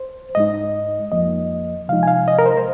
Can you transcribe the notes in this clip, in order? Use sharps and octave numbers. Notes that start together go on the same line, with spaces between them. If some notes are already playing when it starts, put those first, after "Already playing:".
Already playing: C5
G#2 G#3 D#4 D#5
F2 F3 A#3 D#5
C3 F3 G#3 D#4 F5
G#5
F5
D#5
A#4
C5
C5